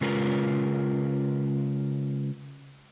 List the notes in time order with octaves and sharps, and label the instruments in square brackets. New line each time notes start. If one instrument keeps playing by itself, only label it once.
[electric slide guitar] C#3 G#3 C#4 F4 A#4 B4